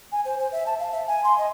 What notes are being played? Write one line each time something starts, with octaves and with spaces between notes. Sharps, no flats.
G#5
C5
C5
E5
A5
F5
E5
G#5
C6
D#5